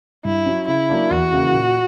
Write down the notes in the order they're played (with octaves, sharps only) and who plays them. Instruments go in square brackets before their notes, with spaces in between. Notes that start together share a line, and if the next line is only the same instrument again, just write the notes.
[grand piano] G2 [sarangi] E4
[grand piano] F#3 C#4
[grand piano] C#3 [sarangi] E4
[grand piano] F#3 A#3 D4
[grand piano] E2 [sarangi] F#4
[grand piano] C#3 E3 A#3
A#2